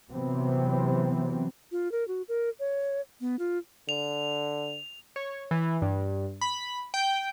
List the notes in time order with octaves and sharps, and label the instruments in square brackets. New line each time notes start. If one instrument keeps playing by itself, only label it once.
[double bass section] C3 E3 F#3 B3 C4
[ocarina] F4
A#4
F#4
A#4
C#5
B3
F4
[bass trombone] D3 [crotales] F7
[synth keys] C#5
E3
G2
B5
G5